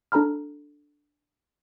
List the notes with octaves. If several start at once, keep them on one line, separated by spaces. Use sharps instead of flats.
D4 A4 A#5 B5 F6